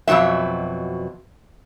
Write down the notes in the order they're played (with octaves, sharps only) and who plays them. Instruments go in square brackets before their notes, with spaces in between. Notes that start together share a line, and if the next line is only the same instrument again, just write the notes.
[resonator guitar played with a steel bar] F2 B2 F#3 C4 E5